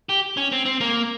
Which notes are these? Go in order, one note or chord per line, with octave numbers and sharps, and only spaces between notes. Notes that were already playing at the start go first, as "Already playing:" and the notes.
G4
C#4
C4
C4
A#3